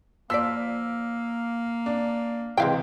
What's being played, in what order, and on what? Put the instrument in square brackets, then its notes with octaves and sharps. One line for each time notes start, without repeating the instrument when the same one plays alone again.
[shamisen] F3 D5 [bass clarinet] A#3 [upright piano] E6 B6
[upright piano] D4
[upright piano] C#2 C3 E3 [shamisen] G#3 F5 G5